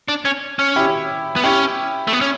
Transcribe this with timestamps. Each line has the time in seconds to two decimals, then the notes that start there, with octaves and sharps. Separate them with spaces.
0.08 D4
0.25 C#4
0.59 C#4
0.76 E4 G4
1.36 B3
1.44 C#4 E4 G4
2.07 A3
2.13 B3
2.21 C#4